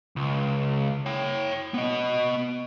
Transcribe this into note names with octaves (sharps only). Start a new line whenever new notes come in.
C#2
C#5 G5
B3 D#5